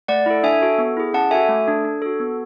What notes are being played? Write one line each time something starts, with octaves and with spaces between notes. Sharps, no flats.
A3 D5 F#5
E4 A4
D4 E5 G#5
F#4 A4
B3
E4 G#4
C#4 F#5 A5
F#4 A4 E5 G#5
A3
D4 A4
D4
F#4 A4
B3